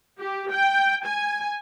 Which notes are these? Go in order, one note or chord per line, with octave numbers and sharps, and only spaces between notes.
G4
G5
G#5